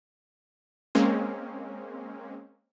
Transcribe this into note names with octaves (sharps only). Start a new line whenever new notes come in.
G#3 A#3 C4 C#4